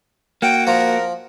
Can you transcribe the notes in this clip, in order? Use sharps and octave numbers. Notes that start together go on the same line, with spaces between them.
A#3 F#4 G5
F3 A#4